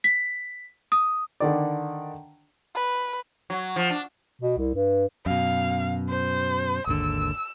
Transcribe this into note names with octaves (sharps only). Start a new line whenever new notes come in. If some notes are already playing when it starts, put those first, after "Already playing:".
B6
D#6
D3 D#3 D5
B4
F#3
F3
D4
B2
C2
G2
F#2 B2 F5
C5
G#1 D#2 D3 E6